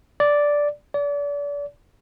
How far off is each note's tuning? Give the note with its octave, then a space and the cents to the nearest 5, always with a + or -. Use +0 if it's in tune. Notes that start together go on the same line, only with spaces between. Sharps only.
D5 -5
D5 -35